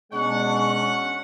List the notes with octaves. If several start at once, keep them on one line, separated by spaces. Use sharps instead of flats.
B2 G#3 C#4 D4 F#5 C#6